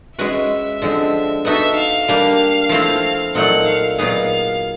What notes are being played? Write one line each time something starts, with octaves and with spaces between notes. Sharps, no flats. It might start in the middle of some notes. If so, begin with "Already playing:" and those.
G#3 C#4 F#4 B4 E5
D3 F3 G#3 C4
B3 D#4 F#4 A4 E5
F5
G3 A#3 D4 G4
F3 A3 C4 E4
A#2 F#3 A3 C4 D#4 F#5
F5
A#2 F#3 B3 D#4 G#4 F5